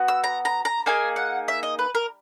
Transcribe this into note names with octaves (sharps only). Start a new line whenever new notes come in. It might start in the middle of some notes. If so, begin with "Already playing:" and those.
Already playing: B3 F#4
E6
A#5
A#5
A#5
A#3 D#4 G#4 G#5
F#5
E5
D#5
B4
A#4